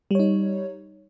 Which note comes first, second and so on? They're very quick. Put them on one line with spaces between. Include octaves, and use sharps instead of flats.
G3 C#5 D#4